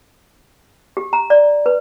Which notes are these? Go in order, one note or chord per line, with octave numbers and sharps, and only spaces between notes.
G4
A#5
D5
B4